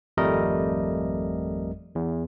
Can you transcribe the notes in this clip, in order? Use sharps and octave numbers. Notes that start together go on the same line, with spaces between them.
G#1 F2 G3 A3 A#4 D#5
E2